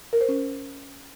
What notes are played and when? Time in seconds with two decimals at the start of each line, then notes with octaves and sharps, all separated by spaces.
0.13 A#4
0.21 C5
0.29 C#4